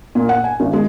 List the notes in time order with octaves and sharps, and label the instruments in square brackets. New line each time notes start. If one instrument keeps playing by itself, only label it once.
[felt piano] A#2
F#5
G#5
G#1
G#3